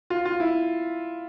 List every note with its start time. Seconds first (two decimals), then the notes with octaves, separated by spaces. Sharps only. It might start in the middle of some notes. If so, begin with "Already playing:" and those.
0.10 F4
0.25 F4
0.40 E4